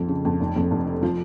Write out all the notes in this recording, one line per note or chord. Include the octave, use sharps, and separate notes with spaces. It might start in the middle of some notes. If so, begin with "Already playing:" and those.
Already playing: A#1 F2 F3
C#3
F2
F1
F2
F1
C3
F3